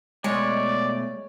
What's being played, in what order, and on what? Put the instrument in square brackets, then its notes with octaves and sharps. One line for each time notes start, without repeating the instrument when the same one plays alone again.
[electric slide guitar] B2 A3 G#5 [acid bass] G#3 [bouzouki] C#5 [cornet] D5